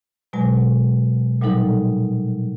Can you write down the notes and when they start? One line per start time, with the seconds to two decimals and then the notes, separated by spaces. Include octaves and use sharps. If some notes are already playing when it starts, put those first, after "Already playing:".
0.33 B2 F#3 G#3 G#5
1.41 A#2 F#3 G3 D#4 A4